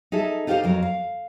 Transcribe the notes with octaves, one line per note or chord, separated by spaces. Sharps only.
D#4 G#4 A4 E5
D#4 F4 G4 G#4 C5 F5
F2 F#3 A#4
F5